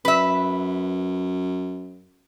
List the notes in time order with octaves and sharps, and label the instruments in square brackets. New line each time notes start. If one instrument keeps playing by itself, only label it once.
[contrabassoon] F#2 [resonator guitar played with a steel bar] B4 E5